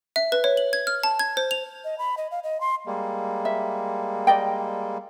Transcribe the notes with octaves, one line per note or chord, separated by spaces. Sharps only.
E5
B4
C#5
F#7
G#6
F6
A5
G#6
C5
F7
D#5
B5
D#5
F5
D#5
C6
G3 G#3 A#3
E5
D5 D#5 G5